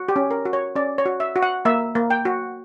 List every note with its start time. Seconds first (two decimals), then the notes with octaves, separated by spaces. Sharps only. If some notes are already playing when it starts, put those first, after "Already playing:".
Already playing: F#4
0.09 G4
0.16 C#4
0.31 A#4
0.45 F#4
0.53 C#5
0.76 C#4 D5
0.98 C#5
1.06 F#4
1.20 E5
1.36 F#4
1.43 F#5
1.65 A#3 E5
1.95 A#3
2.10 G5
2.25 F#4